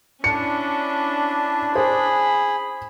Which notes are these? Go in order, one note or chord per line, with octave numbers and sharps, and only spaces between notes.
C#4 D4 E4 C#7
G#4 C5 B5